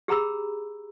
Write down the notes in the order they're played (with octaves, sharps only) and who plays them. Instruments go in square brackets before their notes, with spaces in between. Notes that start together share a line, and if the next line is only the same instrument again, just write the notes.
[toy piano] G4 G#4 A#5 B5 E6